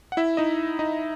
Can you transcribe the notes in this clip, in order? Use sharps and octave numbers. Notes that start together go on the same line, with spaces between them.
F#5
E4 E5
D#4 D#5
D#4 D#5